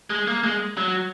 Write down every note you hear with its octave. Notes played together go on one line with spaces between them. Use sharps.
G#3
A#3
G#3
F#3